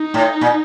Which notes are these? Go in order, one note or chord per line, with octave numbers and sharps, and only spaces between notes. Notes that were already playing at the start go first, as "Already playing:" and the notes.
Already playing: D#4
A2
A#2